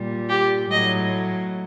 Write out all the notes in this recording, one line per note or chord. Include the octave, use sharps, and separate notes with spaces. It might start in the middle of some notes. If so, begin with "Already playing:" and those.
Already playing: A#2 G3
G4
A2 F#3 D#5